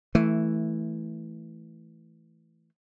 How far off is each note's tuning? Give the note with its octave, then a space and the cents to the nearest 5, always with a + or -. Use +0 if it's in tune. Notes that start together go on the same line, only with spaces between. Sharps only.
E3 -5 A3 +0